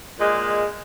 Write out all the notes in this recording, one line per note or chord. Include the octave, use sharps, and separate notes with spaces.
A#2 G#3